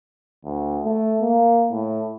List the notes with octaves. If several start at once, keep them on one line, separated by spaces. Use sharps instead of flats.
D2
A3
A#3
A2